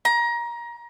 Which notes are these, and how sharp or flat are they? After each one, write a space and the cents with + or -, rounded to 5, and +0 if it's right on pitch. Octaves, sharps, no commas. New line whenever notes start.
A#5 +25